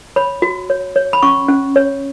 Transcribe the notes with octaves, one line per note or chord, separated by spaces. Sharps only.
C#5 B5
F#4
C#5
C#5
B5
C#4 C#6
C#4
C#5